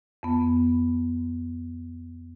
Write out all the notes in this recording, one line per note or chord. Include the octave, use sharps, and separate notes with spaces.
F2 B3